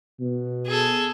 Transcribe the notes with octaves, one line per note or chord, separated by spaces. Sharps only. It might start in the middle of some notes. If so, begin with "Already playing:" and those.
B2
G#4 A4